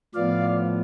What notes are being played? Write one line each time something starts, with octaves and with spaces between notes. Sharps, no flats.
A2 F3 B3 D5 F5